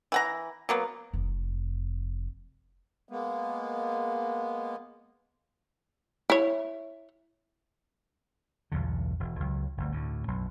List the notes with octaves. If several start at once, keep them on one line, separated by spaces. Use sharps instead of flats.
E3 F#5 A#5
F#3 A#3 B3
F1 F2
G#3 A#3 B3
E4 C#5
B1 E2 G2 D3
E1
C#2 F#3
G1 D2
D2 A2
B1 F#2